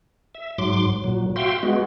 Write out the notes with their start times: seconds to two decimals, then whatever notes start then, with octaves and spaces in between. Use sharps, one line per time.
0.35 E5
0.58 G#2 F#3 C6 D6
1.04 A#2 F#3
1.36 F#4 E5 F5 G5 C6
1.63 G#3 B3 F#4